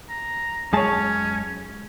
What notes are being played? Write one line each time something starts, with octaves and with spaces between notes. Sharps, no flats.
A#5
F#2 G#3 C#4 G#4 C#5 A5